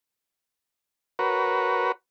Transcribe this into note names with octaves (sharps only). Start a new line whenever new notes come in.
F#4 A#4 B4 C#5